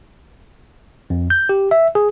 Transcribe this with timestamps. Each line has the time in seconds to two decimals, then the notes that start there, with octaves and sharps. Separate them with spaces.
1.10 F2
1.30 G6
1.49 G4
1.71 E5
1.95 G#4